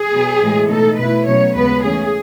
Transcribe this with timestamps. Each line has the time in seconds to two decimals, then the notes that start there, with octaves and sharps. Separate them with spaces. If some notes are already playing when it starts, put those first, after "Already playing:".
Already playing: G#4
0.11 B2 F#3 B3
0.41 A2 E3 G#3
0.69 B2 A3 D#4 A4
0.98 B2 A3 E4 B4
1.26 B2 F#3 A3 C#4 C#5
1.55 D#2 C#3 G#3 B3 B4
1.84 C#3 E3 A3 C#4 G#4